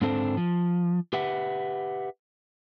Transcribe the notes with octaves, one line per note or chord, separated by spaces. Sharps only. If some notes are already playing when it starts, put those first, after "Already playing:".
G#2 D3 C4 D4 A4 C5
F3
G4 B4 E5 F#5